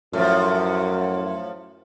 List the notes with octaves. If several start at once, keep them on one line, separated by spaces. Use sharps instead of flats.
F#2 A2 F3